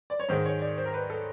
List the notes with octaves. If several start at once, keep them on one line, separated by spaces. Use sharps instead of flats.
D5
C#5
G#2 D#3 G#3 C5
C#5
D5
C5
A#4
B4
A4